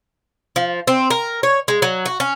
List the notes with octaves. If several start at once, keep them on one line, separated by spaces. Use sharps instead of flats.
F3
C4
A#4
C#5
G#3
F#3
F#4
C#4